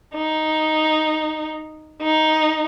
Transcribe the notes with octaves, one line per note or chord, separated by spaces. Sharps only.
D#4
D#4